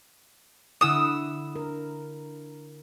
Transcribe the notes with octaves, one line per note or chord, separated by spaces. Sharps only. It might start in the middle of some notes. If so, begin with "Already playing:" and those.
D3 E4 F#5 D#6 E6
A#4